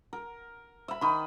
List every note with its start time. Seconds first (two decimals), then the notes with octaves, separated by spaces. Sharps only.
0.13 A#4
0.88 E5 B5
1.01 D#3 B5